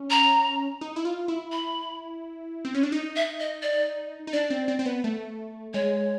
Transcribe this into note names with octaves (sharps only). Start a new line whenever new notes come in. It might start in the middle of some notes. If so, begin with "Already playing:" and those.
Already playing: C#4
A#5
D#4
E4
F4
E4
B5
C4
C#4
D4
D#4
E5
D#5
D5
D#4
D4 D5
C4
C4
C4
B3
A3
G#3 C#5